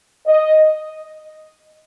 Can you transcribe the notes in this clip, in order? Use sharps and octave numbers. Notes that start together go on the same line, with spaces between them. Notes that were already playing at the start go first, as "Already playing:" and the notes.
D#5